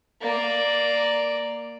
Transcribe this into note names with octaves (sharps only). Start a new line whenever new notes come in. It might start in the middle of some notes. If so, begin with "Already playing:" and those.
A#3 D5